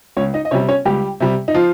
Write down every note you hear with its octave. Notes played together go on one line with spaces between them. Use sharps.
C#2 C#4 C#5
D#4 D#5
D#5
C3 G3 C#4 C#5
C#4 C#5
C#2 G3 G4
C3 G3
D#4
F3 F4